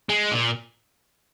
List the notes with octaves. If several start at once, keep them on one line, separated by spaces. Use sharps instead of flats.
G#3
A#2